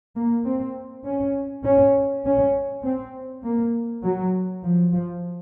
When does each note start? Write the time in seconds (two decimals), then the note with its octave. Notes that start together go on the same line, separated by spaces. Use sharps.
0.16 A#3
0.46 C4
1.06 C#4
1.64 C#4
2.25 C#4
2.84 C4
3.44 A#3
4.04 F#3
4.64 F3
4.93 F3